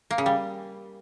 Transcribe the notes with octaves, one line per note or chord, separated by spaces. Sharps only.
A#3
C#3
G3